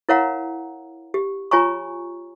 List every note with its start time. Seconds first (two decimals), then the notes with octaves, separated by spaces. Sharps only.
0.09 E4 A#4 C#5 F5 F#5 A#5
1.14 G4
1.51 F4 C#5 G#5 A#5 C#6